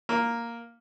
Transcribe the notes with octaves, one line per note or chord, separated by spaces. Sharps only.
A#3